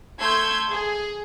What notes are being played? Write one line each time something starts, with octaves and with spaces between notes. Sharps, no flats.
A3 C6 E6 G6 G#6
G#4